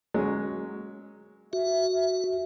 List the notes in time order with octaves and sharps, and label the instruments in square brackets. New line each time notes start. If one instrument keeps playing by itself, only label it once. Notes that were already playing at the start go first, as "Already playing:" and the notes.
[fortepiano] F#3 G#3 C#4
[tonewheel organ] F#4 [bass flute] E5
[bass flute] E5